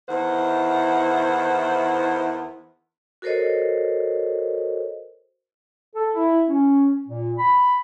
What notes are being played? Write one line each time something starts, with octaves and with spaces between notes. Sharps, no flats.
E2 D#3 E4 C5 F#5
F#4 A4 A#4 C5 C#5 D#5
A4
E4
C#4
A#2
B5